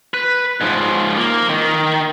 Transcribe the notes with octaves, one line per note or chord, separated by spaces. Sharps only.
B4
G#2 F3
A#3
D#3